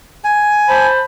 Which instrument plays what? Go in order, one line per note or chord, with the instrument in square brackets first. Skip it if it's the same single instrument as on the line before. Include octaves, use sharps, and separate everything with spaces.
[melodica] G#5
[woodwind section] C5 A5 B5